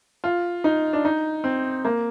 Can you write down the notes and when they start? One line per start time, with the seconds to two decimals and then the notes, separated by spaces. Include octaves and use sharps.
0.24 F4
0.64 D#4
0.93 D4
1.05 D#4
1.44 C4
1.85 A#3